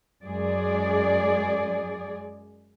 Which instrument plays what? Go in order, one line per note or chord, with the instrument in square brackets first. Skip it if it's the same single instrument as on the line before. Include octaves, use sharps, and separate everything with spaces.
[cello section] F#2 G#3 G#4 D5